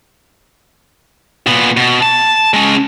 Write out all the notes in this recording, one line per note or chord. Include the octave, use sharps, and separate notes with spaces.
A#2 B3
B2
A5
G#3 C#4